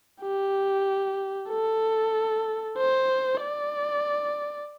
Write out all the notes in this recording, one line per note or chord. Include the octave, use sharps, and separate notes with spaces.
G4
A4
C5
D5